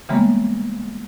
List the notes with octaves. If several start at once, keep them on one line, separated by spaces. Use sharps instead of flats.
C#3 E3 G3 G#3 A#3 B3